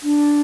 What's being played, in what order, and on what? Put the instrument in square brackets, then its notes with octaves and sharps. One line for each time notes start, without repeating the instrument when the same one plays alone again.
[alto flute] D4